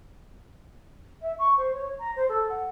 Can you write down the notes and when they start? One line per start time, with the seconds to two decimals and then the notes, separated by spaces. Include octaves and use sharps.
1.22 E5
1.39 C#6
1.57 C5
1.74 C#5
1.99 A#5
2.16 C5
2.29 A4
2.49 F#5